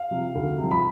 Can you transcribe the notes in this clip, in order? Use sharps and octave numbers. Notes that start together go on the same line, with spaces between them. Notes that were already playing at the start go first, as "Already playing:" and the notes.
Already playing: F5
C3 F3
D2
C3
F3
B5